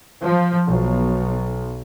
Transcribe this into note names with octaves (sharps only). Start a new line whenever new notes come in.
F3
B1